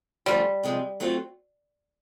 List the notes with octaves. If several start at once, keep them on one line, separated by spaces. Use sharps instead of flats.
D3 F3 G3 A3 C#4
C3 F3 G#3
F#3 A3 C4 F4